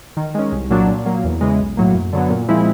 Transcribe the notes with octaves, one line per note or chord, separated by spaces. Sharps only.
D#3
G#3 C#4
C2
A#2 F#3 A#3 D4
A#2
F#3 A#3
E2
C#3 E3 G#3
B1
A2 F#3 A#3
F#2
D3 F#3 B3
A#2
F3 G#3 C4 E4